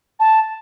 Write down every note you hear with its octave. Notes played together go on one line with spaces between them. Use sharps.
A5